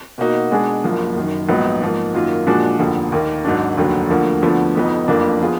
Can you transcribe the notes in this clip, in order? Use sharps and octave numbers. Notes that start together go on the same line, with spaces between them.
B2 A#3 D#4 F#4
B2 G#3 D4 G#4
F#1 F#2 F3 A#3
F#1 F#2 D#3
A#1 G#2 F#3 B3 D#4
G#2 F3 A#3
F#2 D#3 F#3 A#3 F4
A#2 F3 G#3 D4 F#4
F1 D#2 D3 F3
D#2 D#3 A#3
G#1 G#2 F#3 D4
F1 D#2 D3 F#3
D2 D3 F3 A#3
D2 D3 F3 B3
F1 F2 F3 B3 D#4
F#1 F2 F3 A#3 D4
F3 B3 F4 G#4